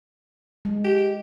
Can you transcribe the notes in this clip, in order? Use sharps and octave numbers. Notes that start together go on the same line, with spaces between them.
G#3
G4